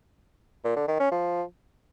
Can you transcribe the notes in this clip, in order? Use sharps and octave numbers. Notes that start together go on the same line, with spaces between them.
A#2
D3
D#3
C#4
F3